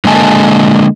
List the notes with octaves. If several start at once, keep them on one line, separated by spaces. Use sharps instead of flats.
D3 G#3 A#3 D#5 G#5 A5